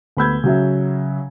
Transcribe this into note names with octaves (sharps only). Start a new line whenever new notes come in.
D2 B3 B5 E6 G6 G#6
C#3 F#3 E5